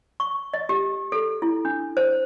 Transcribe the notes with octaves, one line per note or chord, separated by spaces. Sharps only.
C#6
D#5
G4
A4
E4
D4
C5